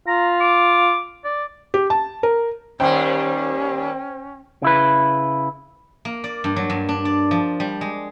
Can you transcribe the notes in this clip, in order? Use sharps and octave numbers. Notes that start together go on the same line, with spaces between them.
F4 A#5
D6
D5
G4
A5
A#4
D#2 G3 C#4 C5 G5
C#3 E4 B4
A#3
D5
G2
F#3
G2
D4
D5
F3
G3
G#3